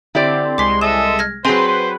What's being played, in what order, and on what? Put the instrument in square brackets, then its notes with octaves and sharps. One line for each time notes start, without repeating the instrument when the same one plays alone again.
[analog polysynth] D3 C4 [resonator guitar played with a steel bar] E4 G4 D5
[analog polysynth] C2 G#3 [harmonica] C6 [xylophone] D6 B6
[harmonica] A4 D#5 E5 [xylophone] E7
[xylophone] F6 G#6 A#6
[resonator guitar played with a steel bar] F#3 C4 [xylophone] G#4 G#5 C6 [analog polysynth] B4 [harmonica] C5
[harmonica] C5